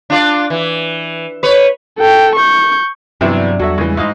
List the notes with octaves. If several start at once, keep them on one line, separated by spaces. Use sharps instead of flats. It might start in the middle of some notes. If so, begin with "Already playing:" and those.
D4 F4 D5
E3
B4 C#5
A4 G5
C#6 G6
G2 C3 E3 F#3 B3 D4 E5
E2 F#3 F#4 A4 E5
C#3 E3 G#3
G#2 E4 F4 D#5 F5